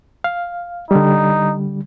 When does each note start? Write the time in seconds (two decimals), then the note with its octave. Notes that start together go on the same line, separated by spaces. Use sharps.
0.24 F5
0.91 D3 G3 D#4